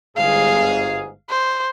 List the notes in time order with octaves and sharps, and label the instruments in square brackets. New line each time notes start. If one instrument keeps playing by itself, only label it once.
[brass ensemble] G1 G#2 G#4 [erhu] F5
[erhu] C5